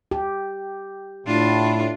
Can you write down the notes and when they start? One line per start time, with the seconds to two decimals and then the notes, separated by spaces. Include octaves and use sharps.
0.11 G4
1.27 A2 D4 F4